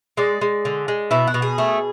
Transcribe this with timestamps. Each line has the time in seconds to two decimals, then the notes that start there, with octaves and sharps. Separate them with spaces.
0.17 G#3 D5
0.41 G#3
0.65 D3
0.88 G#3
1.11 B2 E4
1.27 F#4
1.34 B2
1.42 G#4
1.58 A3